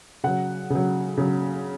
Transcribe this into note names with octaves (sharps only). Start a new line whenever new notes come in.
C#3 F#3 F#5
C#3 F#3
C#3 F#3